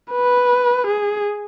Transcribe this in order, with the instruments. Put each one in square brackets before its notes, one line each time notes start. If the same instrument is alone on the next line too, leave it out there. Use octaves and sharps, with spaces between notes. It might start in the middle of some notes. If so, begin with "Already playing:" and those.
[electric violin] B4
G#4